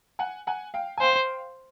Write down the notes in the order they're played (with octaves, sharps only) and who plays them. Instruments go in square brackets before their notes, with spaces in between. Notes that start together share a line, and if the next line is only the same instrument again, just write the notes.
[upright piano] F#5 G#5
F#5 G#5
F5 G5
G#5
[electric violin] C5 [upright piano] F5 G5